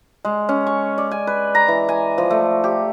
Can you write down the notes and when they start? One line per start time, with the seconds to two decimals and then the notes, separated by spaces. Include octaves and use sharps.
0.25 G#3
0.49 C#4
0.66 C#6
0.98 D5
1.11 G#5
1.27 B4
1.55 A#5
1.68 E3
1.89 G#5
2.18 F3
2.31 A3
2.64 G4